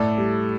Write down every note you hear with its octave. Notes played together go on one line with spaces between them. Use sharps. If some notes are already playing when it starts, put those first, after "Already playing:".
Already playing: A2 A4 D5
G3